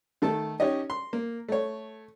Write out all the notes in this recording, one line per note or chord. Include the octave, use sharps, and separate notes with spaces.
D#3 A3 A4 A5
C#4 D#4 G4 C#5 D#5
C6
A#3
A3 C#5